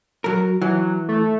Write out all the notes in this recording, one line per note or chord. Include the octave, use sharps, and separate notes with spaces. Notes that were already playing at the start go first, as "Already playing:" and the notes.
F#3 A#4
E3 F#3
A3